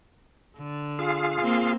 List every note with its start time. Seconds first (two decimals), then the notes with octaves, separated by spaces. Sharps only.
0.58 D3
0.99 F4 G#4 F5
1.41 A#3 C4